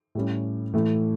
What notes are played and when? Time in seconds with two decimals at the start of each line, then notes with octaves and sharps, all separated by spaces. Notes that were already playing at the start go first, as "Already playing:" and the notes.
0.15 A2 G3 C#4
0.74 A2 E3 A3